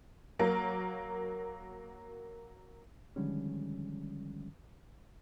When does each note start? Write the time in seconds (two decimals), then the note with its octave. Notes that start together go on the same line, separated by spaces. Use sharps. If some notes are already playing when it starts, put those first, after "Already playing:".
0.39 F#3 A#3 A#4
3.16 D3 D#3 F3 G3 G#3 C#4